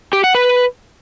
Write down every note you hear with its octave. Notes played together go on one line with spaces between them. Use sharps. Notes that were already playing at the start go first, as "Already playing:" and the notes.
G4
F#5
B4